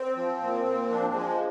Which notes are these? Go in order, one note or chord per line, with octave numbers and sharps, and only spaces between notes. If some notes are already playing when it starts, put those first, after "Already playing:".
Already playing: C4
F3
A#2
A#2
F3 D4
F3 G#3